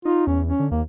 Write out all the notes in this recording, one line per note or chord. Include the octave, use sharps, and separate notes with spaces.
D#4 F4
E2 C#4
C#4
D3
D#2 A#3